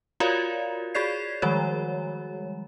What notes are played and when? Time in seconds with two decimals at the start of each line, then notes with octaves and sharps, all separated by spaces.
0.20 F4 F#4 A#4 C#5 D5 F5
0.94 F#4 G#4 C#5 D5 G#6 C7
1.42 D#3 F3 G3 G#3 F#4 C#5